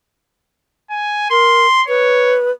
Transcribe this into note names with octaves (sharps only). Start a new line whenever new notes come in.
G#5
A#4 C6
B4 C#5